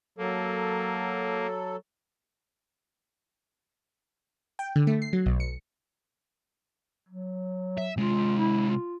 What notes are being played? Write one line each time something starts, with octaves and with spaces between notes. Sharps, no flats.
F#3 A#3 A4
G5
D3
A3
C7
F#3
B1
C#7
F#3
E5
C3 G#3 F4
E4
F4